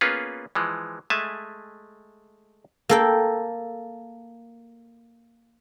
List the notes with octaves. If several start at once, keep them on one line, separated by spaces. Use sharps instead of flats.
A#3 B3 C#4 F4 G#4 B4
E3 F3 G#3
G#3 A3 E5 G#5 A5
A#3 A4 G5